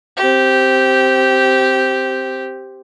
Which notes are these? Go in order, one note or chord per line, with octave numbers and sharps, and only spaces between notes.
C4 G4